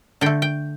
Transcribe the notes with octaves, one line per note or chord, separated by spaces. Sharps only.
D3 A3 G5
G5